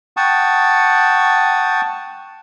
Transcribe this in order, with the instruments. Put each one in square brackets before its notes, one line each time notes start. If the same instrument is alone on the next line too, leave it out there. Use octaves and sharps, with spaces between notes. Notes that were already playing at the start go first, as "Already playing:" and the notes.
[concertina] F#5 G5 A5 C#6 D#6